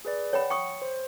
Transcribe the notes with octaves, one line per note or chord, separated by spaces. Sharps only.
G#4 B4 D5
C#5 F#5 G5 B5
G5 C#6 D#6 C#7
C5